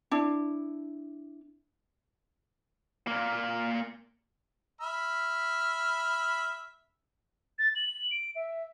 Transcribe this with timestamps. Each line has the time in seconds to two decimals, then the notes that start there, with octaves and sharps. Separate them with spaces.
0.11 D4 E4
3.07 A#2 A#3
4.81 E5 B5 F6
7.59 A6
7.75 F#7
8.11 D7
8.36 E5